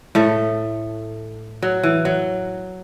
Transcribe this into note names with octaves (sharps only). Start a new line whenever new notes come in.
A2 A3
F#3
E3
F#3